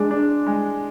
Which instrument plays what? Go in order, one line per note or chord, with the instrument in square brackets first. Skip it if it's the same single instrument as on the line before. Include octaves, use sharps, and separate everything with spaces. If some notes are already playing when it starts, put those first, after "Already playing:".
Already playing: [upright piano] G#3 [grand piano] D4
[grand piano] D4
G#3